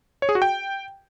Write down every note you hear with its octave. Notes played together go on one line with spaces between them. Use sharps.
C#5
G#4
F#4
G5